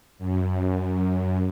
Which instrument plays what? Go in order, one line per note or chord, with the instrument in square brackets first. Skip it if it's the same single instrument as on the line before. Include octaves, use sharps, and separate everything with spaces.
[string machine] F#2